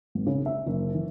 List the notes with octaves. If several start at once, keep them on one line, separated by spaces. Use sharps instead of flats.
G#1
C#3
E5
F#1
E3